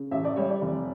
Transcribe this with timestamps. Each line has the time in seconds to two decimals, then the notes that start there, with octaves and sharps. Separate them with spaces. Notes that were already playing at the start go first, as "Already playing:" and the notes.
Already playing: C#3
0.11 A1 E5
0.25 D5
0.36 G3 C#5
0.50 D5
0.61 F1